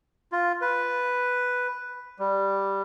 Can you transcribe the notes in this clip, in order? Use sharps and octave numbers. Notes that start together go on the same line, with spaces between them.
F4
B4
G3